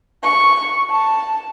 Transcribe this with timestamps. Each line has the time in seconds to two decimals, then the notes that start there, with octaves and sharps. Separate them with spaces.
0.23 C#6
0.91 A5